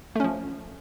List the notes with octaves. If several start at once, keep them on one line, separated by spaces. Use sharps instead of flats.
F3 A3 C#4